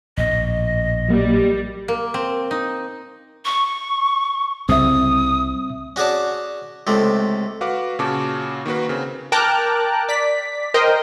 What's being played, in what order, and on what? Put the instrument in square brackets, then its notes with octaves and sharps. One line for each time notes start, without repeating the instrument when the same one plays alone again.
[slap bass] A#1 A2 [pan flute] D#5
[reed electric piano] F#3 A#3 [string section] G3
[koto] A#3
C4
D#4
[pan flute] C#6
[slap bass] C2 C#3 [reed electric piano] C4 E5 [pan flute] D#6
[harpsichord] C#4 F#4 G#4 D5 A5
C#2 C3 A3
[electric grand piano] F#4 B4 F5 F#5 D6
A#2 C#3 C#4 F#4 A5 D6
D#3 A#3 F#4 B4
C#3 C4
[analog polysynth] A#4 G5 A5 A#5 D6 F#6
D5 B6
A#4 C5 D#5 G5